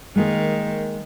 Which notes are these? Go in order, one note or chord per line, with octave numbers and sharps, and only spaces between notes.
D#3 G#3 A#3 G#4